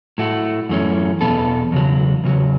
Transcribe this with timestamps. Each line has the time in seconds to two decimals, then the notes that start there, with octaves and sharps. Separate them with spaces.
0.18 A2 A3 F#4
0.69 F#2 E3 A3 C#4
1.21 E2 B2 B3 A4
1.72 E2 C#3 F#3
2.24 E2 C#3 F#3